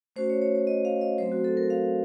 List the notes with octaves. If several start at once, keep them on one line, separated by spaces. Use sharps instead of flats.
A3 C#4 F#4 C5
C#5
C#5
C#5
D#5
F5
D#5
F#3 A3 C4 C5
F#4
A4
A#4
F5